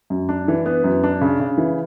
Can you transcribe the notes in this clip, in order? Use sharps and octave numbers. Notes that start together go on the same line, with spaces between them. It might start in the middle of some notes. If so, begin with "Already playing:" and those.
F#2
D4
E3
B3
F#2
D4
C#3
C#3
E3